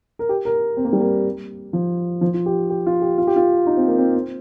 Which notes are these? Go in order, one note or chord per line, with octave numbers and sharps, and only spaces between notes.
A#4
G4
A#4
C4
A#3
G3
A#3
F3
F3
F4
G4
G4
F4
G4
F4
G4
F4
D#4
C4
A#3
C4
C4